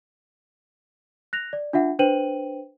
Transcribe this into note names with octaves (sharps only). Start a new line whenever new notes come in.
F#6 A#6 F7
D5
D4 F4 E5 F#5
D4 B4 C5 G5 D#7 F#7